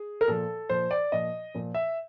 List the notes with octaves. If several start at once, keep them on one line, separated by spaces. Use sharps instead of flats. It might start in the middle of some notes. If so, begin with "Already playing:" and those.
Already playing: G#4
A#4
A#2 F3 A4
A#2 F3 C5
D5
A#2 F3 D#5
A#2 F3
E5